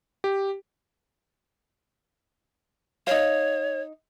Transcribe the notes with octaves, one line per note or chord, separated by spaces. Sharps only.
G4
D#4 C#5 F5